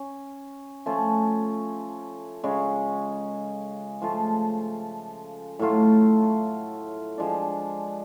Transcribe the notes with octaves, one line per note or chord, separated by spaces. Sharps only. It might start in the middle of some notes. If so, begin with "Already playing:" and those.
Already playing: C#4
F3 A3 C#4 F4
C#3 G#3 C#4
F3 A3 F4
A2 F#3 A3 F4
F3 G#3 D4